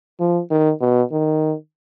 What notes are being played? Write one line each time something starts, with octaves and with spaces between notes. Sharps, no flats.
F3
D#3
B2
D#3